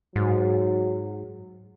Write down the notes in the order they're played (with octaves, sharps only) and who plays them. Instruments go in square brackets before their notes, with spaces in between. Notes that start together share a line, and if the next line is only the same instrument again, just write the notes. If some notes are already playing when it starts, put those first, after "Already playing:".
[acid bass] G#2 [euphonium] F#3